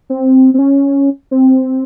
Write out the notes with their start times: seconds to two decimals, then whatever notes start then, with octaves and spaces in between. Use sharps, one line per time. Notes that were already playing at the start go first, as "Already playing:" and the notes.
0.10 C4
0.54 C4
0.59 C#4
1.31 C4